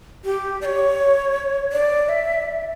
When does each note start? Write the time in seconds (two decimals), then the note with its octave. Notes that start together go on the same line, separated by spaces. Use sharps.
0.24 G4
0.61 D5
0.65 C#5
1.72 D5
2.09 E5